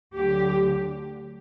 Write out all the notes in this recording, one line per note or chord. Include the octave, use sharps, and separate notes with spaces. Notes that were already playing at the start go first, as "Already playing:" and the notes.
D2 D3 F#3 G4